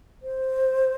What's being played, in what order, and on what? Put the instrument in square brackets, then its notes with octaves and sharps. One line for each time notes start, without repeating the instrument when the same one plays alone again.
[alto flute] C5